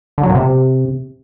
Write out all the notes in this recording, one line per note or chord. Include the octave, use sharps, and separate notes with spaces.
D3
F#3
A#2
C3